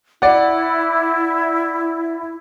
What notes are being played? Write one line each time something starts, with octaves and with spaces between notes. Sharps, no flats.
E4 D5 F#5